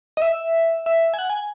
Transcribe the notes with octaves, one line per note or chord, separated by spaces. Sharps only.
D#5
E5
E5
G#5
F#5
G#5